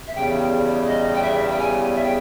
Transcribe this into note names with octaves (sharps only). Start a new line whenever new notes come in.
E5
E2 C#3 G3 G5
D#5
G5
E5
G5
G#5
E5
G5